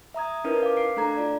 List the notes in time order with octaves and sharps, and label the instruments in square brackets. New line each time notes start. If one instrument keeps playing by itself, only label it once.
[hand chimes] E5 A#5 D#6 G#6
C#4 D#4 E4 A#4 B4
F5 D6
F5 D6 C7 D7
A3 D4 A4 A#5 G#6
F4 D5